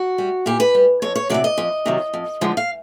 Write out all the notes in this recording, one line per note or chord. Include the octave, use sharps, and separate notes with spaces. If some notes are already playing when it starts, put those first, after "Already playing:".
Already playing: F#4
G3
A#2 G4
B4
G3
F2 C#5
C#5
C3 D#3 F#3 D5
D#5
F2
C3 D#3 F#3
F2
D3 F3 G#3
F5